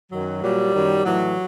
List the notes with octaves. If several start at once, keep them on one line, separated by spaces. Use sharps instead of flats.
F#2 D#3 F#3
A#2 F#3 G3
F#2 D#3 F#3
A2 E3 F#3